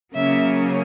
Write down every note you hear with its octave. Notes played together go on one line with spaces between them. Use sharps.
C#3 F#3 A#3 C#4 E5